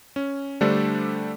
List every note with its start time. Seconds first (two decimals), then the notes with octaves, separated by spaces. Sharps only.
0.16 C#4
0.61 D3 G3 A3 D4 A4 C5